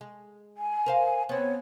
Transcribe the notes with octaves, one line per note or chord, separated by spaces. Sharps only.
G#3
G#5
A#4 C5 F5
B3 C4 C#5